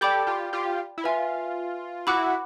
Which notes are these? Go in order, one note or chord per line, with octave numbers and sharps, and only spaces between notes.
G4 A4 D5 G5 B5 D6 G6
F4 G4
F4 G4
E4
F4 B4 E5 G#5
E4 F#4 F#5 B5 D6 F#6